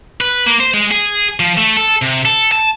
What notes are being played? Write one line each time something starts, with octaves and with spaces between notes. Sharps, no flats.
B4
A#3
C5
G#3
G#4
F3
A3
A4
C3
A4
A5